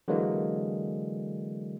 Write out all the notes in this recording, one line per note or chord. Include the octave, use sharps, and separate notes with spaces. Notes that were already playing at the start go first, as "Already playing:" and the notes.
D3 E3 F#3 G#3 A#3